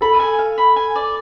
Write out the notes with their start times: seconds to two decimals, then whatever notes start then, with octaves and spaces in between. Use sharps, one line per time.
0.01 A4 B5
0.20 G#5
0.39 F5
0.58 B5
0.76 G#5
0.96 D5